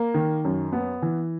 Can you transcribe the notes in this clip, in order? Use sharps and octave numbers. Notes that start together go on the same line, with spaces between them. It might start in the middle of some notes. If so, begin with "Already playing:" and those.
Already playing: A#3
D#3
F#2
B3
E3